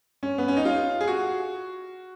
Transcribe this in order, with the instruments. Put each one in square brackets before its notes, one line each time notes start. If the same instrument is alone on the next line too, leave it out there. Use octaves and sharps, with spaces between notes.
[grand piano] C#4
B3
C#4
D#4
F4
G#4
F#4